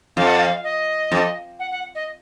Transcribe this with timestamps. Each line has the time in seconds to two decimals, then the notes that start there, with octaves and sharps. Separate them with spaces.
0.16 F2 F5
0.27 F#5
0.36 F5
0.63 D#5
1.12 F2
1.59 F#5
1.71 F#5
1.95 D#5